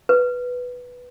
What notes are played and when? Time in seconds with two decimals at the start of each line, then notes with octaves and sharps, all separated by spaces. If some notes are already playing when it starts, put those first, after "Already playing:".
0.09 B4